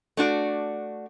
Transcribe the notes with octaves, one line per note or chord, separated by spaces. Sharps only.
A3 D4 F#4 D5